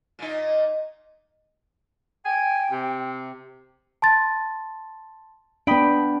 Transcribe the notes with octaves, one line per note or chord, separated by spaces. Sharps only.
A#2 D#4
G5 G#5
C3
A5 C6 A6
B3 D4 G5 B5 D#6 D7